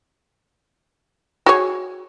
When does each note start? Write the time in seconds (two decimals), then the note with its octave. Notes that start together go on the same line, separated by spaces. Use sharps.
1.46 F#4 G#4 C#5